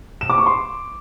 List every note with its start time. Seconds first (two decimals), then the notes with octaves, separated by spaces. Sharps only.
0.21 E7
0.30 D6
0.38 C#6
0.46 C6